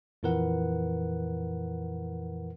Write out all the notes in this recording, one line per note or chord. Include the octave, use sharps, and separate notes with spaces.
F2 A#2 E3 A#4 B4 F#5